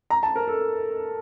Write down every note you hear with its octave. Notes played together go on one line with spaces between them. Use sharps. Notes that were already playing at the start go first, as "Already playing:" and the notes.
A#5
A5
A#4
A4